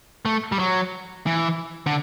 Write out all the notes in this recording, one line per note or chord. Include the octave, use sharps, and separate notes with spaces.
A3
G3
F#3
E3
D3